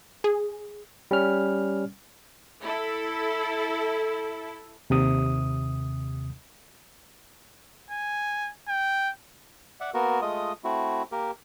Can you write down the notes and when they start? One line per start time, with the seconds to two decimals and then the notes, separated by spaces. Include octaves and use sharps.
0.24 G#4
1.11 G3 C#4 F6
2.61 E4 A4
4.90 D#2 C3 D#6
7.90 G#5
8.68 G5
9.81 D5 E5 F#5
9.94 A#3 B3 F#4 A#4
10.22 G#3 A3 F4 D#5 D#6
10.64 A3 C4 E4 F#4
11.12 A#3 G4 A#4